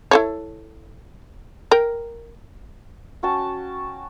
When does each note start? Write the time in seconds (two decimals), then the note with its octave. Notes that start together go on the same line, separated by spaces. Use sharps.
0.11 E4 A4 C#5
1.71 A#4 G5
3.23 C#4 F#4 G5 A5